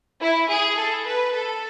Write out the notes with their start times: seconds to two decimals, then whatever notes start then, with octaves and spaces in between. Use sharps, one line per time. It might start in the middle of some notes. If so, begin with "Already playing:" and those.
0.22 E4
0.50 G#4
0.78 A4
1.06 B4
1.34 A4